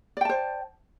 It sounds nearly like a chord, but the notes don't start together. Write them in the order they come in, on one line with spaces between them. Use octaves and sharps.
D5 G5 A5 C5